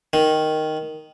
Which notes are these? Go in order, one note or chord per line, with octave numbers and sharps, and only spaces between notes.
D#3